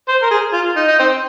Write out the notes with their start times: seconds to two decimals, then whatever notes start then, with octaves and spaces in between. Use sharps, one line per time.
0.09 C5
0.22 A#4
0.31 G#4
0.53 F4
0.76 D#4
0.88 D#4
0.99 C4